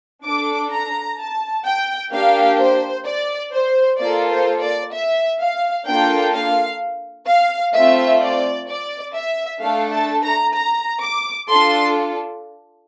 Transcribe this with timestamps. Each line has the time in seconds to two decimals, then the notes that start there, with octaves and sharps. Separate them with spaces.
0.24 D4 A4 D6
0.72 A#5
1.19 A5
1.65 G5
2.12 A#3 D4 G4 F5
2.58 C5
3.06 D5
3.53 C5
3.99 A#3 F4 A4 D5
4.31 C5
4.61 D5
4.93 E5
5.41 F5
5.86 A#3 D4 F4 A4 G5
6.34 F5
7.27 F5
7.74 A3 C4 F4 E5
8.20 D5
8.68 D5
9.15 E5
9.61 A3 D4 A4 F5
9.92 A5
10.23 A#5
10.56 A#5
11.01 D6
11.49 D4 F4 A4 C6